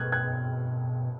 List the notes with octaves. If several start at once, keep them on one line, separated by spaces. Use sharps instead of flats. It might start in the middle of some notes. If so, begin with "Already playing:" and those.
Already playing: B2 D#6 F6 F#6 G#6
F#6 G#6